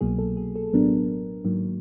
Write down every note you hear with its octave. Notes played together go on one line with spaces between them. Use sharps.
C2 B2 F#3 A#3 G#4
A4
G#4
A4
A1 A2 F#3 B3 D4 A#4
G#2 D#3 F#3 A#3